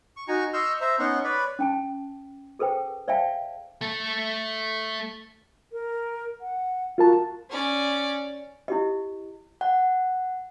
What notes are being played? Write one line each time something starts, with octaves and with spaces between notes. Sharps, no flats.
C#6
D#4 F#4 G#5 A#5 C#6
D#5 C6 C#6 E6 F6 G6
C5 E5 A#5
B3 C#4 D#4 F#5 C6 C#6
B4 C#5 D5 B5
C#4 G5 A5
G#4 A4 B4 C5 G5
C5 D5 E5 F5 G5 A5
A3 A4
A#4
F#5
F4 F#4 A#4 A5
C#4 D5
E4 G4 D#5
F#5